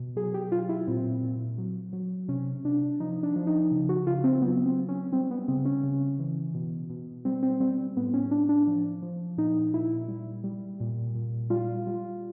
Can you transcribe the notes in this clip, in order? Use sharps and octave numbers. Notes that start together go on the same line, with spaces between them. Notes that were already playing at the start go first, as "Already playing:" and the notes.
Already playing: B2
F#3 G#4
G4
F#3 F4
E4
A#2 C4
A#2
F#3
F#3
C3 C#4
C3 D4
F3 D#4
D4
F3
D#4
C#3
F#4
C#3 F4
C4
F#3 B3
C4
F#3
C#4
G3 C4
B3
C#3 C4
C#4
C#3
E3
B2
B2
G3 C4
C4
G3 C4
A2 B3
C#4
A2 D4
D4
F3
F3
A#2 D#4
A#2 E4
G3
G3
A#2
A#2
G3 F4
G3